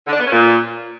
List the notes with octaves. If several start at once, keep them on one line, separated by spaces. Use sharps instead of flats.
D3
D4
B3
C#4
A#2